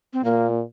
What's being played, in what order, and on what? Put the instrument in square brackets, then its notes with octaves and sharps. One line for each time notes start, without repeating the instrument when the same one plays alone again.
[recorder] C4
[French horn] A#2 [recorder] A#3